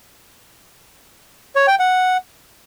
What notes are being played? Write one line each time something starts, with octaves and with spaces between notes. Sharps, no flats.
C#5
G5
F#5